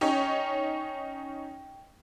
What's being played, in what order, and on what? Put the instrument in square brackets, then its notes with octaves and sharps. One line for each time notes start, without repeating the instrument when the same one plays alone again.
[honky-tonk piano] C#4 D#4 C#5 [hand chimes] G5